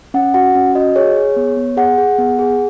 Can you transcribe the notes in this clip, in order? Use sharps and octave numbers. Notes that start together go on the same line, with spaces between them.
C#4 F#5
F#4 F#5
C#4
F#4 D#5
G#4 C#5
G#4
B3
B3
G#4 F#5
G#4
B3
G#4